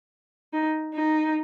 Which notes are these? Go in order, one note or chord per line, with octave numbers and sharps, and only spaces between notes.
D#4
D#4